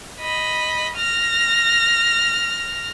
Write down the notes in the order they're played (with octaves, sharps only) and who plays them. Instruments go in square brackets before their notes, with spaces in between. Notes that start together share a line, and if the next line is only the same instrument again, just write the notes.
[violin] D#5 B5
F6 A#6